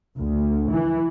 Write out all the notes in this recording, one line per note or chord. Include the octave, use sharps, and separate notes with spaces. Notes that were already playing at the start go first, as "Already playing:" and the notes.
D2
E3